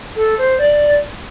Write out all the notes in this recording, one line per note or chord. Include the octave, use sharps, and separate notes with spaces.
A4
C5
D5